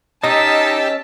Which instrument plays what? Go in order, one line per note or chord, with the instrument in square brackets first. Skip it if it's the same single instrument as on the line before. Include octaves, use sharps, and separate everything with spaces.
[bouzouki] C#4 D#5 [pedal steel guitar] D#4 [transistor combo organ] G4 E6 [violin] A5 B6